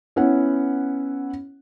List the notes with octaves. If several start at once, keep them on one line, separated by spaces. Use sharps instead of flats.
B3 C#4 E4 F#5